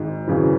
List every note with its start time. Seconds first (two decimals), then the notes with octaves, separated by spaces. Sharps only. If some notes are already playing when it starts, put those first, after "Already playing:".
Already playing: G#1 G#2
0.27 G#1 F#2 C#3 E3